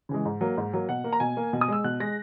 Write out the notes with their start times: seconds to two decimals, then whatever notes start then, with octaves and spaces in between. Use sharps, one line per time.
0.09 C#3 E3 G#3
0.25 G#2
0.41 F#3 A#3
0.57 G#2
0.73 F#3 A#3
0.89 B2 F#5
1.04 A#3
1.13 A#5
1.20 B2 G#5
1.37 A#3
1.53 B2
1.61 D#6
1.68 G#3 E6
1.84 B2 F#6
2.00 G#3 A#6